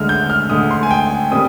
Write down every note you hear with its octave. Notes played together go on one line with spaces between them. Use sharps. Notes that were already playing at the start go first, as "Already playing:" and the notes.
Already playing: D2 D3 G#3 F6
G6
F6
D2 D3 G#3 D#6
C6
G#5
G5
A#2 G3 C4 D#6